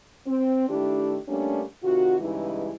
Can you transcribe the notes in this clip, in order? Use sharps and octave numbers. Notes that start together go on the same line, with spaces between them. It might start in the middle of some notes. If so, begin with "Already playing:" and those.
C4
D#3 A3 D4 E4 G4
G3 A3 A#3 C#4 D4
C3 D#3 F4 F#4
G2 C#3 E3 G#3 D#4 E4